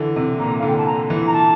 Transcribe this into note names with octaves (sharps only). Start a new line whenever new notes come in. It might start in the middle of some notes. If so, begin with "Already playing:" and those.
Already playing: D3 E3
C3
A#2 A#5
D3 F5
G5
A5
A#5
E3
A#5
A5